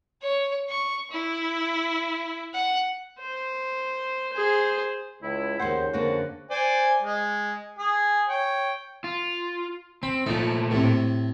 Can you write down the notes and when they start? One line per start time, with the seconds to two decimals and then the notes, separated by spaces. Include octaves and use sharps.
0.22 C#5
0.69 C#6
1.11 E4
2.54 F#5
3.20 C5
4.33 G#4 C5
5.23 C#2 E4
5.59 D#2 C#3 C5 E5 F#5
5.93 F2 D3 A#3 F#4
6.50 C5 D5 G#5
7.02 G#3
7.79 G#4
8.28 C#5 G5
9.04 F4
10.03 C4 B5
10.26 A#2 F3 A3 D#4
10.71 A2 C3